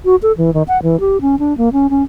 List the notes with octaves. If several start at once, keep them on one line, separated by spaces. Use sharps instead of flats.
F#4
A4
E3
D#3
F#5
E3
G4
C#4
D4
A#3
C#4
C#4